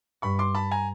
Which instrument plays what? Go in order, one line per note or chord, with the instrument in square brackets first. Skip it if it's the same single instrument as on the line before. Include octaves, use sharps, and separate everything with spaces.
[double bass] G2 [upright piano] B5 C#6
[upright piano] C6 D6
A5 B5
G#5 A#5